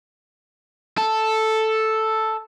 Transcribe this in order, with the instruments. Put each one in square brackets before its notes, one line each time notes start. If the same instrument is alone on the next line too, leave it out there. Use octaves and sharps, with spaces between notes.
[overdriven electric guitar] A4